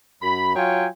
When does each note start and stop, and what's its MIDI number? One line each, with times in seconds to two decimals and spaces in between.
0.22 0.55 42
0.22 0.55 83
0.56 0.86 54
0.56 0.86 65
0.56 0.86 73
0.56 0.86 79
0.56 0.86 80